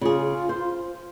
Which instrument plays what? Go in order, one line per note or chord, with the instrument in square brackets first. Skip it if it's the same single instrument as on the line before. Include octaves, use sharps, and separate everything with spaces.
[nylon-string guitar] C#3 G#4 [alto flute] F4
[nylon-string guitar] C5